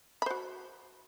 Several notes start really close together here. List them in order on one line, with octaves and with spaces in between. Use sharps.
B5 C5 F#4